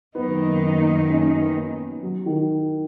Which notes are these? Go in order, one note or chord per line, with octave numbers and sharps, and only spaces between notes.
F#2 D#3 A#3 B3 D#4
C#4
B3
F#3
D#3